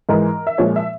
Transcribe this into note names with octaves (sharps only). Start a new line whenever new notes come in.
G#2 E3 G#3 A#4
E5
A#2 F3 G#3 C#5
E5